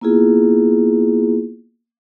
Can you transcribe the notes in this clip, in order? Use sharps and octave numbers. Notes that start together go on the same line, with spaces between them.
A#3 B3 E4 F4 G#4